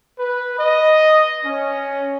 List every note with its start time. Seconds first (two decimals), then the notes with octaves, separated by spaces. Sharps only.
0.19 B4
0.59 D#5
1.45 C#4